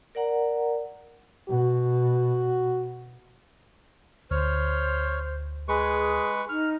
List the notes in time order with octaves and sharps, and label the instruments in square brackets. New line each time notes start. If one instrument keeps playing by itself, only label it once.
[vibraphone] A#4 D5 F#5 A#5
[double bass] B2 [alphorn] F#4
[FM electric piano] D2 [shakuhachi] C5 [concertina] C#5 F6
[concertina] G#3 B4 C#6 [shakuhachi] G#4
[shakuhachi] D#4 [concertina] F6